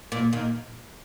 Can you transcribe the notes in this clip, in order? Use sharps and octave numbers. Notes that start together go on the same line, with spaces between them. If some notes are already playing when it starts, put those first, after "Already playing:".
A#2
A#2 D#3